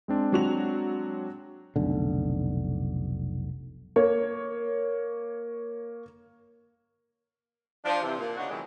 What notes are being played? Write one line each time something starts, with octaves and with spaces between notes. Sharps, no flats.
G#3 C4 D4
F#3 F#4 F7
F1 B1 D3
A#3 C#5
F3 D4
C3 E3
A#2
C#3 A#3 D4 D#4 F#4
B2 D#3 E3 F#3 G#3 D4